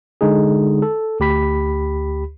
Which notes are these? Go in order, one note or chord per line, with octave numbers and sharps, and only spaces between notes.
D3 G#3 D#4 G#4
A4
D2 G4 B5 B6